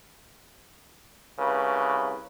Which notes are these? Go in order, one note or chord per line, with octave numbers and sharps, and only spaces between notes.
C2 C#3 B4